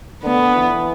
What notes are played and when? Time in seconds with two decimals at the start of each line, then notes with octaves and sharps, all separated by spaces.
0.23 D3 B3
0.55 E3